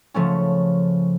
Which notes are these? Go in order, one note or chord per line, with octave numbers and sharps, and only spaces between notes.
C#3 F3 A3 C#4